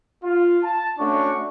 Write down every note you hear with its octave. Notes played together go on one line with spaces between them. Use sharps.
F4
A5
A3 C#4 D4 F#4 C#6